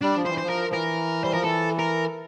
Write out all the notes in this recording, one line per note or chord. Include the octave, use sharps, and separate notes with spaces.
G3 D4
F3
C5
E3
C5
F3
A#4
F3
E3 A#4
G3 C5
F3 A#4
E3 A4
A#4